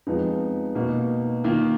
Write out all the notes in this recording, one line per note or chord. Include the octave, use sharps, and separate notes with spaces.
F2 F3 G#3 B3 D#4
B2 A#3 D#4 F#4
D#3 A#3 F4